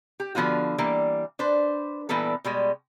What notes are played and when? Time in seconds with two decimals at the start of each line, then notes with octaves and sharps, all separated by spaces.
0.20 G4
0.35 D3 F3 B3 F4 F#4
0.78 E3 G3 A#3
1.39 D4 B4 C5
2.09 A#2 E3 G3 B3 A4
2.44 B2 G3 G#3